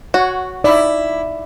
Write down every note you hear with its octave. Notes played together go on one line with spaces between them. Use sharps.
F#4 C#5 F#5
D#4 E4 D5 B5 E6